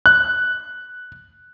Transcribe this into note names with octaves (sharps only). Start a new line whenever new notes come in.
F#6